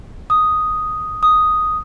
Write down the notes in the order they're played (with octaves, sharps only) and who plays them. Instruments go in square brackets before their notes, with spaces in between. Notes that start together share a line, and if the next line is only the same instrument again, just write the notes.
[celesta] D#6
D#6